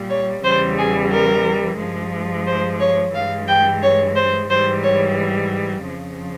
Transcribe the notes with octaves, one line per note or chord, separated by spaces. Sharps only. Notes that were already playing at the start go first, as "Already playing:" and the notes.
Already playing: A#2 G3
C#5
E2 C#3 E3 G3 C5
G#4
A#4
G2 F3 G#3
C5
C#5
G2 E3 G#3 F5
G5
C#5
C5
G#2 E3 G3 C5
C#5
F2 C#3 F3